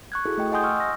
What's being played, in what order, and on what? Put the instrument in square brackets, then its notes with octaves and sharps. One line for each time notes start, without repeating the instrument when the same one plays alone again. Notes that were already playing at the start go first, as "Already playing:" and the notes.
[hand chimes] C#6 F#6 G#6
E4 F#4 G#4 A4
A3 D#5 G5
D#5 F#5 G#5 C6 D#6 G6
C#6 E6 F6
A#6